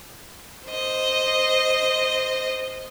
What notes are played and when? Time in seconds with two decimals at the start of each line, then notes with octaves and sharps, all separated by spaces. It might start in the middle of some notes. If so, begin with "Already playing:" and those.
0.68 C5 D#5